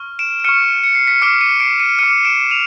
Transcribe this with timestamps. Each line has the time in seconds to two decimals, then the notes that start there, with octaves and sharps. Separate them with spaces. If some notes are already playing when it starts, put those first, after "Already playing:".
Already playing: C#6 F6
0.19 D7 E7
0.40 D7
0.44 C#6 F6 C#7 D#7
0.84 C#7
0.95 C7
1.07 B6 C#7
1.22 D6 F6 C7 D7
1.41 C#7 D#7
1.60 C7 D7
1.80 C#7 D#7
1.99 D6 F6 C#7 D#7
2.25 D7 E7
2.50 D#7 F7